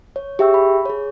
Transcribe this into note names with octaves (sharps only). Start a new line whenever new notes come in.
C#5
G4 G#4 E5 G5 C#6 E6
B5
G#4 C#5